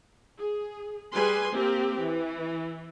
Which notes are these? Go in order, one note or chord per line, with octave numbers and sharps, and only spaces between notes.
G#4
G3 G#4 B4 G#5 C6
A#3 C4 G4
E3